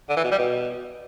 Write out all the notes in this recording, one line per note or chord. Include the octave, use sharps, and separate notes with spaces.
D3
E3
B2
G3
B2